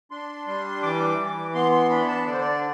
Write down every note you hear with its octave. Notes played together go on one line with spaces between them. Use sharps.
D4 C6
G3 C6
E3 D6
E3
B3 C6
C6
D4 B5
A5
D3 D5
C5
D5